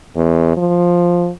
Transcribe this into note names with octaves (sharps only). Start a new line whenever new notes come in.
E2
F3